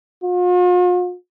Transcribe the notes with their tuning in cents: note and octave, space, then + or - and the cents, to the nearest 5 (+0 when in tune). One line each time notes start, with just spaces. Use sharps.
F4 +45